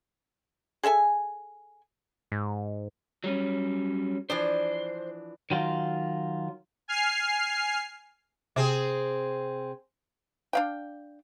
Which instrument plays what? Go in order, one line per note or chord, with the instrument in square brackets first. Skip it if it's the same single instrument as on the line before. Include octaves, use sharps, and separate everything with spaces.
[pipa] G#4 A4 E5 G#5
[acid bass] G#2
[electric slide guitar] F#3 G3 C#4
[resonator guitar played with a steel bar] E3 F3 D4 [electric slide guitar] C5
[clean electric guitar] D#3 F#3 F4
[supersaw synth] G#5 F6 C7
[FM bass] C3 [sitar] C4 G#4
[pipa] D4 F5 G5